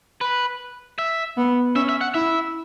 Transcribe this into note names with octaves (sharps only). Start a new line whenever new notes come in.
B4
E5
B3
C#4 E5
E5
F#5
E4 E5